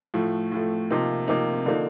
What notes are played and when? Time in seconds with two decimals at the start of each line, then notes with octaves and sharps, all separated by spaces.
0.14 A2 F3 A3
0.52 A2 F3 A3
0.90 C3 F3 A#3 D#4
1.28 C3 F3 A#3 D#4
1.66 D3 F3 A#3 D#4